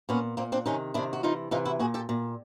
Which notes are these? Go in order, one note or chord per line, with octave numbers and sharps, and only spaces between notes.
A#2 B3 C#4
A#2 A#3 C4
C4 D4
C3 D#3 C#4 D#4
C3 D#3 D4 E4
F#4
C3 E3 D#4 F4
C3 E3 D#4 F4
E4 F#4
A#2 F#4 G#4
G4 A4
A#2